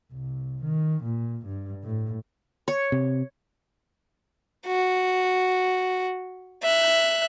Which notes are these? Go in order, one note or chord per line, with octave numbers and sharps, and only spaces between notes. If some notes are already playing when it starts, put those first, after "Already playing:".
C2
D#3
A#2
G2
A2
C#5
C3
F#4
E5 F#6